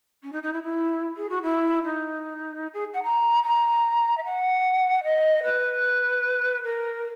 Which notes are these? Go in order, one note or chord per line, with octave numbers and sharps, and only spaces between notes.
C#4
D#4
D#4
E4
E4
G#4
F#4
E4
D#4
G#4
F#5
A#5
A#5
E5
F#5
D#5
B4
A#4